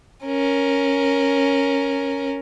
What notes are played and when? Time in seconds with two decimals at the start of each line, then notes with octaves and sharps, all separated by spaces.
0.25 C#4 A#4